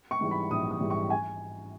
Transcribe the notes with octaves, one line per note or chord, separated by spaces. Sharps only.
C#6
G#2 E3 G3
B5
A#1 D#6
D#6
G#2 E3 G3
C#6
G#5